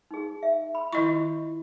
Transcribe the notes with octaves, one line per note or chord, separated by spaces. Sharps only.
D#4 G#4
E5
B5
D#3 E4 F4 D#5 C#6